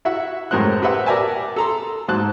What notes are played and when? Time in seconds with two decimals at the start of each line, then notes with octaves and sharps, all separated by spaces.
0.05 E4 F#4 E5 F#5
0.51 F#2 A2 G#3 A#4 C5 F#6
0.82 G4 B4 C5 E5 F#5
1.06 G4 A#4 D5 E5 G#5 A5
1.56 A4 A#5 C6
2.08 G#2 F#3 C5 A5 F#6